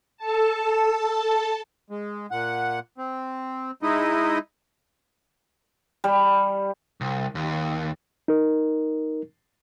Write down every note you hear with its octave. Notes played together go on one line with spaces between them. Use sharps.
A4 A5
G#3
A#2 F#5
C4
G#3 D#4 E4 D#5
G3
C2
D#2
D#4 A#4